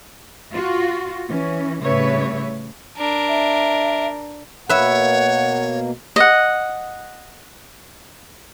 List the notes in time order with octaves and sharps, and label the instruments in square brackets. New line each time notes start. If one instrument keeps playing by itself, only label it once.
[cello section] F4 F#4
E3 C#4
A2 C#3 G3 B4 C#5 E5
[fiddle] D4 A#4
[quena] E5
[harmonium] B2 A#3 [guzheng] B4 E5 [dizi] C#5 [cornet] F#5
[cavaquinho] D#5 F#5